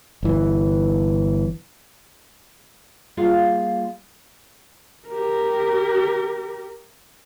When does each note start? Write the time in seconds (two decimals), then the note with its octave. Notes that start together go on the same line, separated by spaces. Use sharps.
0.23 G1 E3
3.17 G3 A#3 F4 G#4 F5 F#5
5.09 G4 A#4